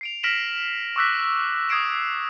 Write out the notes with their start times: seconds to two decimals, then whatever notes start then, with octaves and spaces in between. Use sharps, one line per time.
0.01 C7 D7 F7
0.23 F6 A#6 B6 D7 E7 F#7
0.96 C#6 D6 E6 F#6 A#6 B6
1.24 B6
1.69 D#6 G#6 C7 D7 E7